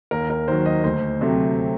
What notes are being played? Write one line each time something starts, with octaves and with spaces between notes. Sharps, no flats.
D#2 A#4
A#4
D#3 F#3 C5
D#5
D2 C5
C3 F#3 A3 C4